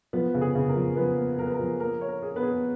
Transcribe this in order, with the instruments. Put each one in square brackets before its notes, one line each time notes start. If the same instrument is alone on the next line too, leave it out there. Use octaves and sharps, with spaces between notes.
[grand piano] F3 [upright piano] B3 B4
[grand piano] C#3
[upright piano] G#4
[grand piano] C#3
[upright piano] A#4
[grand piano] F3
[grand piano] F3 [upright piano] B3 B4
[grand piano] A#3
[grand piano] F3 [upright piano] A#4
[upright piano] B4
A#4
[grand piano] F3
[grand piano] A#3 [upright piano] A#4
[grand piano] C#5
[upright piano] A#4
[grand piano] G#4
[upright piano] B3 B4
[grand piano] G#4